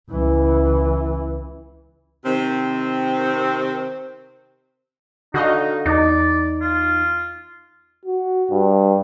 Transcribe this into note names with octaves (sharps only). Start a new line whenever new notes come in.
C#2 E3
C3 D#3 C4
D3 D#4 F#4 D#5 F5
E2 D#4 D5
F4
F#4
G2